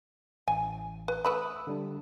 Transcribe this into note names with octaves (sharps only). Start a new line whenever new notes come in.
A1 G#5
B4
A3 B4 B5 D#6 E6 F#6
D3 G3 D4